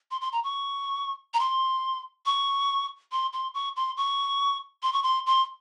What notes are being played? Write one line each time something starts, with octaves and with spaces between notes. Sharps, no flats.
C6
C6
A#5
C#6
A#5
C6
C#6
C6
C6
C#6
C6
C#6
C6
C#6
C6
C6